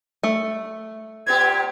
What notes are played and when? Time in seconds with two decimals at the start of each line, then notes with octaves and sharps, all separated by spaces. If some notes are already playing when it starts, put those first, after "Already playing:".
0.23 A3
1.27 A#2 B3 G4 G#6